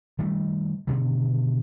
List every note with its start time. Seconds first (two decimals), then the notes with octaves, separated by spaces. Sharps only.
0.19 D#3 G3 A3
0.87 B2 D3 D#3